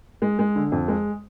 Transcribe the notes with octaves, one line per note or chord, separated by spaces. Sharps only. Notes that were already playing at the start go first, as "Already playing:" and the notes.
G#3
G#3
D3
F2
G#3